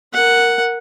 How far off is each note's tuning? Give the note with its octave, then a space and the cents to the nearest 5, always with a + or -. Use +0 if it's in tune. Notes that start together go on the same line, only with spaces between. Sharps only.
A#4 +0 F#5 +0